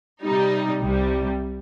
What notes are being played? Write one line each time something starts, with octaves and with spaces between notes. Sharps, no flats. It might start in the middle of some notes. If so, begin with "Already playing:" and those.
C3 G3 D#4
C2 C3 G3